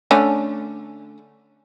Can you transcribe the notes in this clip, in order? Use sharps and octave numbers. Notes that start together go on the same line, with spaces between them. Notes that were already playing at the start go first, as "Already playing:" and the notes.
D3 A3 C#4